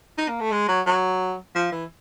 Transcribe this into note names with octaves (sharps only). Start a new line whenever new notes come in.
D#4
A#3
A3
G#3
F#3
F#3
F3
E3